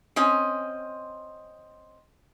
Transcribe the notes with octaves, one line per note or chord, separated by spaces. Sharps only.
C4 C#4 D#5 G#5